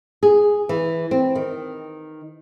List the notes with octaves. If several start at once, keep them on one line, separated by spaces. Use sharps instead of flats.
G#4
E3
C4
D#3